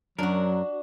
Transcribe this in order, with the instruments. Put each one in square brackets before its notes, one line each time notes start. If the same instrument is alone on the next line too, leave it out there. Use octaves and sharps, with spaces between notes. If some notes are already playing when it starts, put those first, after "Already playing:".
[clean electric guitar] F#2 A#4 [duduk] F#3 [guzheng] D4 F#4